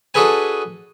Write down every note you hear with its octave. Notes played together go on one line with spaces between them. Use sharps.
D4 F#4 G#4 A4 B4 G#5